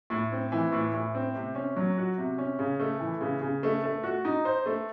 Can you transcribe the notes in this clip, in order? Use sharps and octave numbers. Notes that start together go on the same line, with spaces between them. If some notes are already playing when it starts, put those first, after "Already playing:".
A2
C4
E3
A2
A2
C4
C3
C#4
F#3
F#4
C3
C#4
C#3
A3
E3
C#3
C#3
A3
A3
F#4
D#4
C5
A3